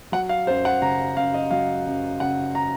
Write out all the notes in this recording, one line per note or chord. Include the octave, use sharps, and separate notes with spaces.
F#3 F#5
F5
F#2 C5
F#5
C#3 A#5
F#2 F5
D#5
F#3 F5
F#2
C#3 F#5
A#5